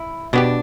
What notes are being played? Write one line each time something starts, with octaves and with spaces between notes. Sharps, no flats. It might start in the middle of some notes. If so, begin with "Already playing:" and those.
Already playing: E4
B2 B3 D4 G4